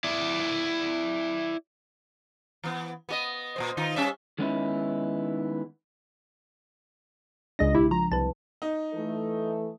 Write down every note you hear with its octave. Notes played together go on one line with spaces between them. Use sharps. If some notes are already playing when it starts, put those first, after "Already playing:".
E4 D5
E3 B3
B3 F#4 D#5
A#2 F#3 C5
D#3 D#4 F4
G3 C#4 E5
D#3 G#3 B3 C#4 D#4 E4
C#2 C#3 G#3 D4 D#5 A#6
B1 E4 G4
F3 A#5
C2 B4 A5
D#4
E3 A3 A4